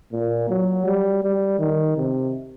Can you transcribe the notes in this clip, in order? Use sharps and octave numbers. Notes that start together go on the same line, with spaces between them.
A#2
F#3
G3
G3
D#3
C3